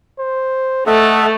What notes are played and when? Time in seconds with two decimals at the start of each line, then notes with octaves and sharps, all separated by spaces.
0.19 C5
0.87 A3 A4 D#5 E5 F#5